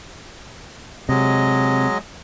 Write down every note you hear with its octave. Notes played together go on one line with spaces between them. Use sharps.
C3 F#3 G#3 D#5